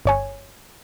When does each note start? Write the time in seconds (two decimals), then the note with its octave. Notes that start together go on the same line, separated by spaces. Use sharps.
0.06 G1 C#5 G#5